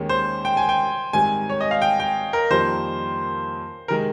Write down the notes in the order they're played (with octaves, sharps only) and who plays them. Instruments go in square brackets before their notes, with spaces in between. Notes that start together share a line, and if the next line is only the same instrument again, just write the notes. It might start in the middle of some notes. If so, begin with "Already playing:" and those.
Already playing: [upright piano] D#2 D#3 G#3 C#4 G4
[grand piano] C5
G5
G#5
G5
[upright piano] G#2 D#3 G3 C4 [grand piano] G#5
[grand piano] C#5
D#5
F5
G5
G5
A#4
[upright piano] F2 D#3 G3 A#3 [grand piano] C5
[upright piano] C3 D#3 G#3 [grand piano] A#4